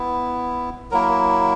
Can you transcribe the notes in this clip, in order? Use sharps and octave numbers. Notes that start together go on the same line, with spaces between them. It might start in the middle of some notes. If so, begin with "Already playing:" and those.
Already playing: B3 E4
F#3 A#3 E4 A#4